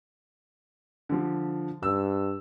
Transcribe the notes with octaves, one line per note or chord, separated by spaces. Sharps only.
D3 F3
G2 E6